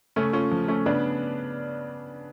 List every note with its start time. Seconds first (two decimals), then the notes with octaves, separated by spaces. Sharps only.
0.16 C#3 A3 C#4
0.33 C#4 F4
0.51 F3
0.68 A3 C#4
0.86 C#3 B3 D4